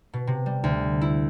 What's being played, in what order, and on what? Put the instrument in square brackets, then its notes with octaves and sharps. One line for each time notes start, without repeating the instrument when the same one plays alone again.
[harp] B2
C3
G3
D2
E4